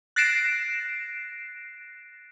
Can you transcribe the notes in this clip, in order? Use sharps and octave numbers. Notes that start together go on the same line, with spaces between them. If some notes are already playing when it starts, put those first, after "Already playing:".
F#6 A6 A#6 C7 D7 E7